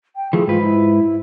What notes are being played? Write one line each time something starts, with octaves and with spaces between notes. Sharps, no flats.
G5
E3 F3 A3 G#4
G#2 F4 B4
E4